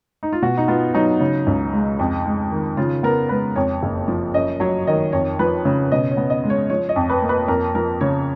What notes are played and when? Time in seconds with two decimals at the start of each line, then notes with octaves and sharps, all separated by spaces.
0.23 D#4
0.33 F4
0.42 B2 F#4
0.57 D#4
0.68 B3 F4
0.94 F#3 D#4
1.20 C#3
1.47 C#2
1.73 G#3
1.99 F2
2.26 G#3
2.51 D#3
2.77 C#3 F4
3.03 B3 A#4
3.29 G#3 B4
3.56 F2 C#5
3.83 F#1
4.08 F3
4.34 F#2 D#5
4.60 F#3 C#5
4.87 D#3 D#5
5.13 F2 C#5
5.39 F3 B4
5.65 C#3
5.92 B2 D#5
6.11 C#5
6.17 B3
6.30 D#5
6.44 G#3
6.50 C#5
6.70 F3 C#5
6.89 D#5
6.96 F2
7.10 B4
7.22 A#3
7.29 B4
7.48 F2 A#4
7.75 F3 A#4
8.01 C#3 C#5